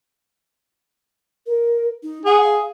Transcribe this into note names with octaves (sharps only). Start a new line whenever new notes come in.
A#4
D#4
G#4 F#5
F5